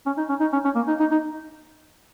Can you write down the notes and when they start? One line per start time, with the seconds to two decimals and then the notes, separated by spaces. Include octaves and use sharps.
0.06 C#4
0.17 D#4
0.29 C#4
0.40 D#4
0.53 C#4
0.65 C#4
0.75 A#3
0.88 D#4
1.00 D#4
1.12 D#4